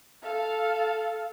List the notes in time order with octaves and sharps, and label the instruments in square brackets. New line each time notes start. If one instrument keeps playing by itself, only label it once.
[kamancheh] A4 F5